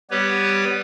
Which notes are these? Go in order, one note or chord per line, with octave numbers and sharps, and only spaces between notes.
G3 B3 G4 B4 C#5